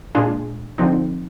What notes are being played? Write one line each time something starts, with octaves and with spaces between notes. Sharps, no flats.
A#2 G#3 D4 F4 G#4
D3 F3 C4 D#4